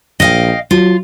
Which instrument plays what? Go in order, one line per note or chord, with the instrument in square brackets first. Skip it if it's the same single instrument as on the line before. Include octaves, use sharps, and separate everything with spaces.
[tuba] A#1 [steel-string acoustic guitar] D#5 F5 G5
[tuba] F#3 [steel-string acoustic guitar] F4